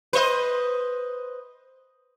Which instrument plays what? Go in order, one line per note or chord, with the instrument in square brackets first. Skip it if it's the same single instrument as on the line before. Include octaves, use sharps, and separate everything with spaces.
[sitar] B4 C5 D#5